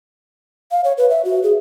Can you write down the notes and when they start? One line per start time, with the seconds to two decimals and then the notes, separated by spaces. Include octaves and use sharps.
0.71 F5
0.84 C#5
0.98 B4
1.10 E5
1.25 F#4
1.43 G#4